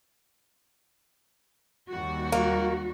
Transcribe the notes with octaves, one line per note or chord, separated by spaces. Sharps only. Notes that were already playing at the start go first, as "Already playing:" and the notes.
D#2 G3 F#4
A#3